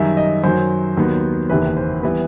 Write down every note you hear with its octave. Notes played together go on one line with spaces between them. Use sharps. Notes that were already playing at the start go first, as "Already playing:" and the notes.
Already playing: F#2 D#3 G3 E5
D#5
F#2 D#3 F#3 C5
D#2 D#3 F#3 B3
F#1 E2 C3 D#3 B4
C5
E3 G3 B3 B4